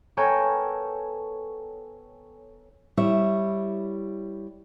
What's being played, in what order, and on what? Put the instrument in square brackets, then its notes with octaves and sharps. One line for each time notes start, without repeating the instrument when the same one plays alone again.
[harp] B3 A4 A#4 C#5 G5 G#5
[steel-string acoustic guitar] G3 E4 C#5 E5